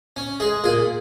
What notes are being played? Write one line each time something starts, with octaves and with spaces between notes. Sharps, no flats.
C#4
G#3 G#4
A#2 G#4